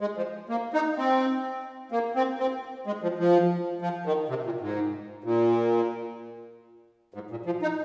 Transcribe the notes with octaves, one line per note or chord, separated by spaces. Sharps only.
G#3
F3
A#3
D#4
C4
A#3
C4
C4
G#3
F3
F3
F3
D#3
C3
A#2
G#2
A#2
G#2
A#2
F3
D#4